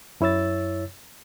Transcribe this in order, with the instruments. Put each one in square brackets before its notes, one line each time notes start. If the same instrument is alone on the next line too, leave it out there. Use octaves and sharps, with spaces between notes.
[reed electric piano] F#2 E4 C#5 E6 A6